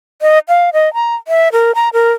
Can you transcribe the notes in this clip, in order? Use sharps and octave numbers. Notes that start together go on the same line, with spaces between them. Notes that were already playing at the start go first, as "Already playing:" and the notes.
D#5
F5
D#5
A#5
E5
A#4
A#5
A#4